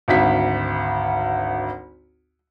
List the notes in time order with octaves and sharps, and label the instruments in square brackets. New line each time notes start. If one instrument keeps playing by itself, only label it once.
[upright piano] G#1 D2 B6